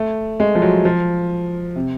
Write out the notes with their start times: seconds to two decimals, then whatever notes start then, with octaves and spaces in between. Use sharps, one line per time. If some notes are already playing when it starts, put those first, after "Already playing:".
Already playing: A3
0.40 G#3
0.55 F3
0.62 F#3
0.85 F3
1.76 C3